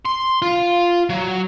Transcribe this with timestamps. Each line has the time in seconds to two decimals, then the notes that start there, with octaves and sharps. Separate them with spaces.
0.05 C6
0.42 F4
1.09 F#3